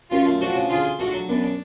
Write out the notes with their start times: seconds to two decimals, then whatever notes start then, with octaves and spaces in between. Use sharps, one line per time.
0.11 F#2 C#4 F4
0.25 A3
0.41 F3 D4 F#4
0.55 C#3
0.70 D3 F4 G#4
0.85 F4
0.99 A3 D4 F#4
1.13 F#3
1.28 F#2 B3 D4
1.43 D4